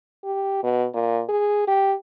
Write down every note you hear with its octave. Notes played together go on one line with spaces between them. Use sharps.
G4
B2
A#2
G#4
G4